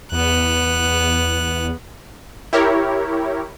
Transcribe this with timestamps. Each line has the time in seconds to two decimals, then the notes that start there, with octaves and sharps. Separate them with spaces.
0.12 E2 B3 F#6
2.53 E4 G4 A#4 C#5